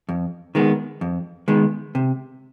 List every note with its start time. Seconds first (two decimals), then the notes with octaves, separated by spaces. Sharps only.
0.09 F2
0.55 D#3 G#3 B3
1.01 F2
1.48 D#3 G#3 B3
1.95 C3